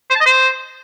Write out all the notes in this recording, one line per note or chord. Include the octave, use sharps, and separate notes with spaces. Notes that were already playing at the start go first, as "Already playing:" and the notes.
C5
A5
D#5
C5